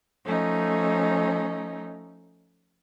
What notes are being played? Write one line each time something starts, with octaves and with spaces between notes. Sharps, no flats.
F3 A3 C#4 D#4